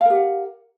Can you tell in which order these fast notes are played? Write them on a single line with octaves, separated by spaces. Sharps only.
F5 A#4 G4 F#5